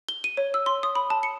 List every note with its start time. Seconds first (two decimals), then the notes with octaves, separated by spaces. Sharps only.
0.09 G7
0.24 D#7
0.37 C#5
0.54 E6
0.66 C6
0.83 D#6
0.95 B5
1.10 A5
1.23 C#7